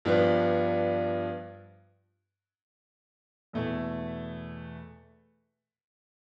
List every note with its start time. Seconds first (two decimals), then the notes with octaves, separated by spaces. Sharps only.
0.05 G2 F3 B3 D4
3.53 E2 B2 A3 E4